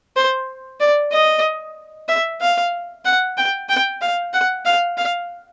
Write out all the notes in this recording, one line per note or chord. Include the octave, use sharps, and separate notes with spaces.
C5
D5
D#5
E5
F5
F#5
G5
G5
F5
F#5
F5
F5